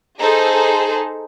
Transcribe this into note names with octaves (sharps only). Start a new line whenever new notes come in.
D#4 G#4 A4 C5